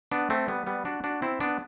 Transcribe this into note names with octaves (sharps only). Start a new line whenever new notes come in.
B3 D4
A3 C4
G3 B3
G3 B3
D4 F#4
D4 F#4
C4 E4
B3 D4